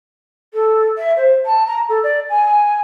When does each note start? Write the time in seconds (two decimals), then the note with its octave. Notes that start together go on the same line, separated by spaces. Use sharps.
0.54 A4
0.98 E5
1.17 C5
1.46 A5
1.66 A#5
1.89 A4
2.04 D5
2.29 G#5